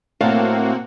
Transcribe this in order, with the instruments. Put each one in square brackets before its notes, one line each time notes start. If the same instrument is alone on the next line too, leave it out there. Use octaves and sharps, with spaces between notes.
[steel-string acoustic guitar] A2 F5 A5 [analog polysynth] A#3 C4 F#4